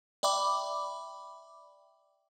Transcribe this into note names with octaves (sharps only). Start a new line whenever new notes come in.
D5 E5 G5 B5 D6